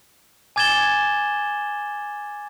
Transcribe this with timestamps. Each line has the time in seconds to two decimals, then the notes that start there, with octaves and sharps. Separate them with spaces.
0.56 G#5 D6 G#6 A6 E7 G7